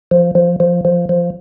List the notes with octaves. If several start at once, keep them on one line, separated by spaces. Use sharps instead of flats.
F3
F3
F3
F3
F3